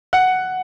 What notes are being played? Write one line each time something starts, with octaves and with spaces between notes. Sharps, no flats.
F#5